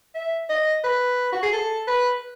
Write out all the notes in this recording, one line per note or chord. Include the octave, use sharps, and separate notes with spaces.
E5
D#5
B4
F#4
G#4
A4
B4